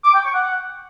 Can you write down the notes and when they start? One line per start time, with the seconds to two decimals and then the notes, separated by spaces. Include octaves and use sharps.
0.04 D6
0.14 G5
0.23 C#6
0.33 F#5